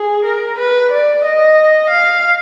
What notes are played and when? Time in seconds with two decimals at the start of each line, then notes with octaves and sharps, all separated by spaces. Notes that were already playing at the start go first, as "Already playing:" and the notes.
Already playing: G#4
0.25 A#4
0.59 B4
0.91 D5
1.24 D#5
1.90 F5